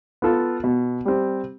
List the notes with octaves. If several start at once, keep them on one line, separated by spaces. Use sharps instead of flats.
B3 F4 A4
B2
G3 C4